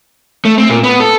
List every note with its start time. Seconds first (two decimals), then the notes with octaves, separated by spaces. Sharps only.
0.45 A3
0.58 C4
0.69 A#2
0.83 B3
1.00 A4